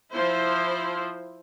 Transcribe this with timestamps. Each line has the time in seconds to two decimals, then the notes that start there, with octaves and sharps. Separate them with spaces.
0.13 F3 E4 C5